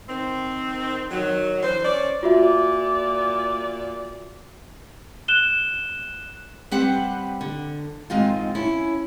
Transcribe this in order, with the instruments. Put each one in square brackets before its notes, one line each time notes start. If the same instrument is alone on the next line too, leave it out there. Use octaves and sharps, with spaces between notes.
[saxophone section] D#3 C4
D#3 F#3
E3 D4 C5
C#4 C#5 D5
[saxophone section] A#2 D5 [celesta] F4 F#4 E5
[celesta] F#6 E7 G7
[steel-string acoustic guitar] G3 C4 G4 B4 F#5
D3
G#2 D#3 G#3 C4 F4
C#4 E4